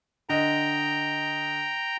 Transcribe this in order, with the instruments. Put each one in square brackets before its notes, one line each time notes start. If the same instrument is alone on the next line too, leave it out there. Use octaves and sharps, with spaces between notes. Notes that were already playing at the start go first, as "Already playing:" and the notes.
[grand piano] D3 D#5 [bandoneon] G5 A#5